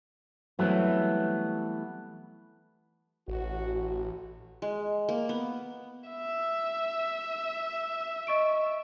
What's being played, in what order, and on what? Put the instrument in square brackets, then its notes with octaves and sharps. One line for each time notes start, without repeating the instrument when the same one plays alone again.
[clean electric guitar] E3 A3 B3 [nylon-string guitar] F#3 G3 C4
[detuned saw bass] A1 [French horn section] F#4
[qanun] G#3
A#3
B3
[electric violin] E5
[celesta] D#5 C#6 D7